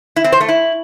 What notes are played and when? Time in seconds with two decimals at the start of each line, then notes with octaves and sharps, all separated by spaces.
0.16 E4
0.24 C4
0.32 C5
0.40 A3
0.48 E4